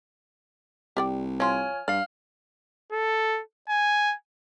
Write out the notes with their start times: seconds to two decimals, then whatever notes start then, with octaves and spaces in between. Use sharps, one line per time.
0.97 C2 G4 D5 G5
1.40 F3 F4 C#5 G#5 F6
1.88 G2 D5 F5 F6
2.92 A4
3.70 G#5